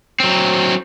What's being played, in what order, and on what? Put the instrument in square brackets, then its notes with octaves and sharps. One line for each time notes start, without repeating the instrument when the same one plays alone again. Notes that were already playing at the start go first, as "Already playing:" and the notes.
[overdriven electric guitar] F#3 C4